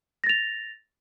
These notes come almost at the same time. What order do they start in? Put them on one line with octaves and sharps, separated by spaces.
A#6 A6 F7